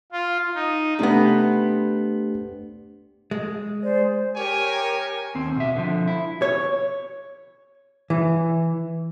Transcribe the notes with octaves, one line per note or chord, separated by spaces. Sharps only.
F4
D#4
C3 A3 B3 D4 G4
G#3
G#4 C5 D5
G4 A#4 C#5 G5 G#5
D#2 C4
B2 E5
D3 F3
E4
C#5
E3